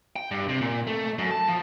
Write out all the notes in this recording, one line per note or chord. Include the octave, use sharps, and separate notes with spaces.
G5
G2
C3
A#2
A3
F#2
A5
F3